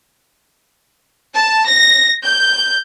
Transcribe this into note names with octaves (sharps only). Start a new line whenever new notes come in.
A5
A#6
G6